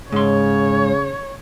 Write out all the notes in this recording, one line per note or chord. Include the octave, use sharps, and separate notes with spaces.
G#2 C#3 C#5 C6